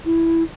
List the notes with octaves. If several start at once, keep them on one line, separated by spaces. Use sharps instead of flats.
E4